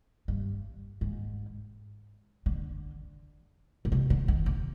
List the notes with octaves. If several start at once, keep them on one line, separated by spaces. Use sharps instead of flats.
G2
G#2
D3
B2
C3
D3
D#3
D3